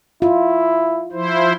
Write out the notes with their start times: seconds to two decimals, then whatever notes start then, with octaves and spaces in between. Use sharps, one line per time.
0.22 E4 F4
1.12 F3 E4 C5